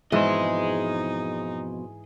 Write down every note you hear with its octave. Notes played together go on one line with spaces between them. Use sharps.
F2 G#2 B2 E3 D#4 G#4 C5 D#5